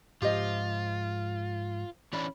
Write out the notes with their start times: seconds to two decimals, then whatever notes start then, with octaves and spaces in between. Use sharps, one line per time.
0.22 G#2 F3 F4 G4 C5 D#5
2.13 E3 C#4 D4 B5